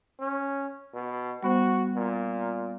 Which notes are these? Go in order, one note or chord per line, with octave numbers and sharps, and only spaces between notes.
C#4
B2
G3 B3 F#4 C5
A#2